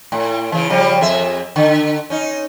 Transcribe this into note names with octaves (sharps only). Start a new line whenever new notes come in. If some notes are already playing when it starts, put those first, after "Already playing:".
A2
C#3 E3
C#3 F3 G3
F2 G#4 E5
D3
C#4 D#4